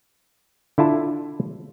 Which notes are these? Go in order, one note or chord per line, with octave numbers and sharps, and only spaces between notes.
D3 E4 F4 A5